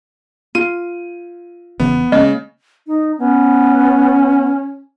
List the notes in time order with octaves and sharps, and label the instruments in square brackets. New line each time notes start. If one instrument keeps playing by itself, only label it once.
[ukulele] F4 [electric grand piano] D#7
[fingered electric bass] E1 C#3 E3 [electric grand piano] B3
[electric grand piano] C#3 [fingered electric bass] G#3 A#3 C#4 [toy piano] D#5
[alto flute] D#4
[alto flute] B3 [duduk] C#4